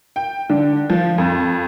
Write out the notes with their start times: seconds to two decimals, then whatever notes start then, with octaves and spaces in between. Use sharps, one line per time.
0.16 G5
0.50 D3
0.90 F3
1.18 F2